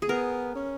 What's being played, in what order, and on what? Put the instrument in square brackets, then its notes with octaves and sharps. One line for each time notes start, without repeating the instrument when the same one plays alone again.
[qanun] G#4
[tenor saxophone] B3 [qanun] A#4
[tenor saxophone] C#4